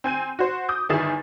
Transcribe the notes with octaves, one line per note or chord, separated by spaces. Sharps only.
C4 G#5 G6 D#7
F#4 C5
D6 D#6 G6
G1 D#3 E4 G#4 A6 E7